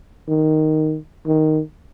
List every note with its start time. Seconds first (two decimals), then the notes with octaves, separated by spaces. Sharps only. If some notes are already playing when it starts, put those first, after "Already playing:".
0.29 D#3
1.26 D#3